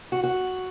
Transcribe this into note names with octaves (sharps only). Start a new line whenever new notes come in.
F#4
F#4